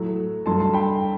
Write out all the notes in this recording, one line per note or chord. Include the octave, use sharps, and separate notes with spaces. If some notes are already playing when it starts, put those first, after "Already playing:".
Already playing: A2 F#3 A3
G2 F#3 A3 A5 C6
A5 C6
G5 B5